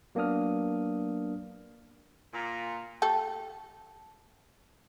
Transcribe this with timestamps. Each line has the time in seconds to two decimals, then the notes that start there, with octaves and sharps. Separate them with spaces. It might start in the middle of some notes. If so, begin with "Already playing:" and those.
0.15 F#3 A#3 B3 D4 D#6 F6
2.34 A#2
3.02 A3 G4 A4